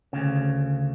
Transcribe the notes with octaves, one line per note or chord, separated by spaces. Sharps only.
D2 C#3